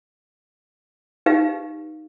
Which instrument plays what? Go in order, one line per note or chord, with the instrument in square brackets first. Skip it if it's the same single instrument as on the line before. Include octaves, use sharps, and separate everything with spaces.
[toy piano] D#4 G4 B4 F5